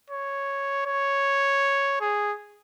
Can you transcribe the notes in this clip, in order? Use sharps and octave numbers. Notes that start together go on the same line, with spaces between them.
C#5
C#5
G#4